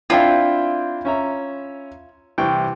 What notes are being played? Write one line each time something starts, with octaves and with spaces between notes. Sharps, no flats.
C4 D4 E4 F4 G5
C#4 E5 A#5
C2 E3 G5